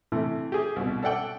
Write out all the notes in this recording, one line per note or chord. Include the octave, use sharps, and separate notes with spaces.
C3 E3 A3
G4 G#4
C2 B2
A4 D5 F#5 G5 D6